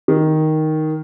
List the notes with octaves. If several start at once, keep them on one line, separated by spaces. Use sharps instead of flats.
D#3